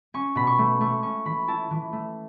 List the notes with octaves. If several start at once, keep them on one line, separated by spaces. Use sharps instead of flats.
C#4 C#6
B2 B5
C#6
A3
A3 C#6
C#4 C#6
E3 B5
E4 A5
E3
A3